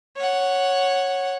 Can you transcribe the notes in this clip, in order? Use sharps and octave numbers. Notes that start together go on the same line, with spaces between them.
C#5 F#5